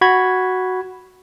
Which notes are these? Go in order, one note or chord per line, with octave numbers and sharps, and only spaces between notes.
F#4 B5 G#6